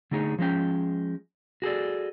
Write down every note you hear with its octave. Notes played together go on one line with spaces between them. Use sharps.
D3 A3 D#4 G#4 A4 C#5
F3 G#3 C#4 G5
F#4 G#4 A4 D5